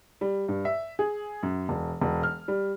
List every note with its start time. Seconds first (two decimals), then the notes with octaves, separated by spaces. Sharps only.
0.21 G3
0.48 G2
0.65 E5
0.99 G#4
1.43 F#2
1.69 E1
2.02 E1
2.23 F6
2.48 G3